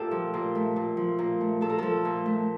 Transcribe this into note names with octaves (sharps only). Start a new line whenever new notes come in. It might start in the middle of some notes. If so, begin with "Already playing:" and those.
Already playing: A#2 A3 F4 G4 A4
F3
A#2
A3
A#2
F3
A#2
A3
A#2 A4
A#4
F3 A4
A#2
A3